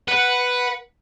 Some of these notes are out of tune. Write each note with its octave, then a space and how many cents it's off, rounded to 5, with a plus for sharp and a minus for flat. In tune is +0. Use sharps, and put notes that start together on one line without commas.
B4 +0 F#5 +0